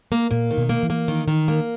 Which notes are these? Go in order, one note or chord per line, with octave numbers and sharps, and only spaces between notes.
A#3
A#2 A#3
D#3
B2
A#3
E3
A#3
D#3
D#3
A#3